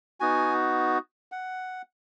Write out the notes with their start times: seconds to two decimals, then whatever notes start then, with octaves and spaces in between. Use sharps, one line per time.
0.20 B3 D#4 F#4 G#5
1.32 F#5